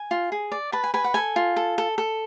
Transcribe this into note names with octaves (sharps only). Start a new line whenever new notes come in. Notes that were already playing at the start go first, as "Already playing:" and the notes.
Already playing: G#5
F4
G#4
D5
B4 A5
G#5
B4 G#5
F#5
A4 G#5
F4
A4
A4
A4